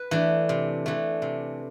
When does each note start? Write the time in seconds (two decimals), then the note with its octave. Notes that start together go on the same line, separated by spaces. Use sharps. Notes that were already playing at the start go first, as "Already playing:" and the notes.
Already playing: B4
0.11 E3 A3 D4
0.49 C3
0.86 E3 A3 D4
1.22 C3